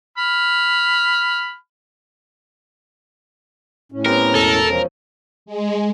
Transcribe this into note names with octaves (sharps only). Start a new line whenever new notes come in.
B5 F6
A2 C#4
B3 C4 G4 A#4
E1 A4 D#7
F3 C#4
G#3